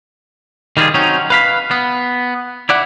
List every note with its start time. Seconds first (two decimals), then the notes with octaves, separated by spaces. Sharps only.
0.77 D#3 G3 F4 F#4 G#4
0.94 F#3 C4 C#4 D#4
1.30 B4 F5 B5
1.71 B3
2.69 E4 D5 F#5